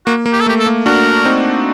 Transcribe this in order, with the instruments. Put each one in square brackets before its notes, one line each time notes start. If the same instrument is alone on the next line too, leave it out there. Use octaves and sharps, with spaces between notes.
[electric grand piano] A#3 [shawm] F#4
[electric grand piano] A#3
[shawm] G4
A4
[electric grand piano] A3
[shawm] G4
A4
[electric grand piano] A#3
[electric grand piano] D4 F#4 [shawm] A#4
[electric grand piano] C4 D#4